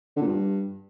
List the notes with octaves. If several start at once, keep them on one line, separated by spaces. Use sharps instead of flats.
D3
A#2
G2